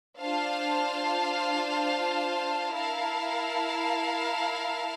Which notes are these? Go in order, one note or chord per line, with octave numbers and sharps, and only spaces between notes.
D4 F4 C5 F5 A5
E4 A#4 F5 A5